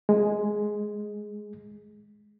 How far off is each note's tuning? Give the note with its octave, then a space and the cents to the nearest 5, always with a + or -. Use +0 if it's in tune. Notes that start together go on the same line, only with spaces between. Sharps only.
G#3 +5